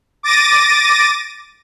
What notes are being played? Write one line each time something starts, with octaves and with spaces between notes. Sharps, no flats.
D6 A6 A#6 D#7